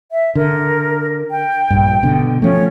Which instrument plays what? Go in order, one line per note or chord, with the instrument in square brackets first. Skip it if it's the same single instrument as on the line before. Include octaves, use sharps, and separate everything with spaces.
[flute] E5
[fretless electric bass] D3 [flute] A#4
[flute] G5
[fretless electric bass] A#1 G2
B2 D3
[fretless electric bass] F3 A3 [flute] C#4